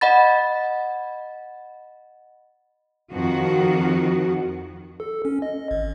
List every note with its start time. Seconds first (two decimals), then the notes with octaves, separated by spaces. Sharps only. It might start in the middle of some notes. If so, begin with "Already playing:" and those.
0.01 D#5 F#5 B5 A6
3.11 F2 D#3 F#4
5.00 A4
5.25 C#4
5.42 D#5
5.71 G#1